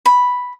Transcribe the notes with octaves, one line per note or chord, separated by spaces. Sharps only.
B5